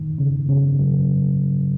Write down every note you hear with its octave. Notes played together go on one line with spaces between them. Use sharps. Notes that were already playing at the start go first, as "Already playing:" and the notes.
Already playing: D#3
C#3
C#3
F#3